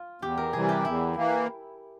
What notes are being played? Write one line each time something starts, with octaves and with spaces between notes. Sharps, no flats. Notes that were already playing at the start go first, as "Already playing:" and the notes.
Already playing: F4
E2 G4
A#4
C3 E3 G3 G#4
G4
E2 E4
E3 A#3